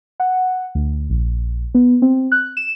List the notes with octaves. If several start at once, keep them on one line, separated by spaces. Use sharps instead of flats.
F#5
D2
A#1
B3
C4
F#6
E7